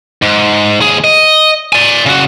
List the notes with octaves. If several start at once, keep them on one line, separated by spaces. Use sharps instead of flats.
G#2
D#2 G#4
D#5
D5 G#5
C#3 F#4